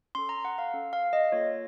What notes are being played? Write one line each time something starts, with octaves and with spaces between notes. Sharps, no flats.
C#4 A4 C6
A#5
F#5
F5
C#4 A4
F5
D#5
A#3 F4 A4 C#5